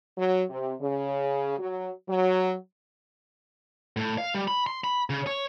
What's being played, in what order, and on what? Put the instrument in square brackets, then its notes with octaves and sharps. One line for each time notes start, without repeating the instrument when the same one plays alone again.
[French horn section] F#3
C3
C#3
F#3
F#3
[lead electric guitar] A2
F5
G3
B5
C6
B5
C#3
C#5